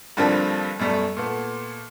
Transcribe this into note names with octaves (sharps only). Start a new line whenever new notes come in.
G2 D3 F3 G3 A#3 C4
F#2 B2 G3 A3
A#2 A3 B3